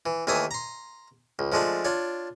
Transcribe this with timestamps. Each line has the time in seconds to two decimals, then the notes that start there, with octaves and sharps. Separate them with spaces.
0.06 E3
0.27 D#2 E3 A3 E5 G#5 D#6
0.51 A#5 C6
1.39 C#2
1.52 F3 G#3 A3 D4
1.85 D4 F4 C#5